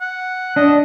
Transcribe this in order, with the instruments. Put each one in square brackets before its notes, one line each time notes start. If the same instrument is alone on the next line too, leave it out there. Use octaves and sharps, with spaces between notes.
[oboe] F#5
[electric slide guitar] D4 [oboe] D#5